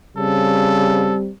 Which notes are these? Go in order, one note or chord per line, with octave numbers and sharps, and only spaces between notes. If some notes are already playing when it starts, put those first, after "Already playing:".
C#3 G3 C4 A4